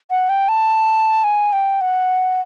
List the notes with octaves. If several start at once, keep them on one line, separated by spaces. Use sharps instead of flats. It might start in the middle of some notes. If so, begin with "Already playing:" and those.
F#5
G5
A5
G#5
G5
F#5